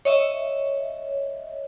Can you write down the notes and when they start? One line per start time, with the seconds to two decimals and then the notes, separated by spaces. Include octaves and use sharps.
0.05 C#5 D#5 E5